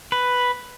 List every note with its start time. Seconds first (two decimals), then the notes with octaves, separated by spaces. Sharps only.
0.12 B4